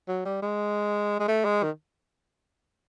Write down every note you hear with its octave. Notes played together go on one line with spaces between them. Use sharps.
F#3
G3
G#3
G#3
A3
G#3
D#3